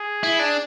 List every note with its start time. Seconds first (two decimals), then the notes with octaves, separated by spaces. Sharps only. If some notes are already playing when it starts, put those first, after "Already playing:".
Already playing: G#4
0.23 E4
0.39 D4